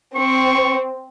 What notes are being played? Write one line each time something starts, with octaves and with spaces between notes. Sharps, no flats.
C4 C#6